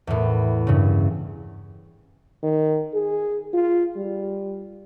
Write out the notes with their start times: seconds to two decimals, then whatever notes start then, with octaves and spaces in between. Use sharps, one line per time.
0.07 E2 A2
0.67 G2 C#3
2.43 D#3
2.94 G#4
3.54 F4
3.96 G3